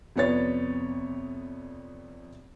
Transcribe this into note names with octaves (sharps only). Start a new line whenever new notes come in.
F2 C3 B3 C#5 D5 A6